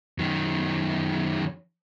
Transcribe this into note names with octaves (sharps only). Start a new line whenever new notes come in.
F#2 D#3